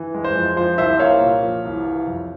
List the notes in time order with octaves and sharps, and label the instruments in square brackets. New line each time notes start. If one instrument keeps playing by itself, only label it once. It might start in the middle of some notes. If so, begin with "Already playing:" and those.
Already playing: [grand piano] E3
G#3
C5
F2
F3 C5
C2 C5 E5
A#3 C#5 F5
A#2
F3
C2
E3
F2